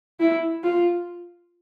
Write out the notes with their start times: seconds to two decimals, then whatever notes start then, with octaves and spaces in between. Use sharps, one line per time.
0.20 E4
0.64 F4